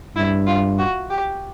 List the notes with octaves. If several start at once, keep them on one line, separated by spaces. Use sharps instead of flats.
G2 E4
F4
F#4
G4